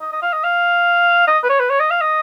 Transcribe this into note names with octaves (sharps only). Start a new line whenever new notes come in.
D#5
D#5
F5
D#5
F5
D#5
B4
C#5
B4
C#5
D#5
F5
D#5